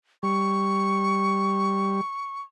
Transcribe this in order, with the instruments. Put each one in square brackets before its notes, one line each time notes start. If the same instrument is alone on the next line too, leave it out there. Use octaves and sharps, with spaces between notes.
[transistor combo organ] G3 [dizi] C#6